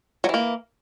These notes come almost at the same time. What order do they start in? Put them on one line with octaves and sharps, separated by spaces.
F#3 E3 A#3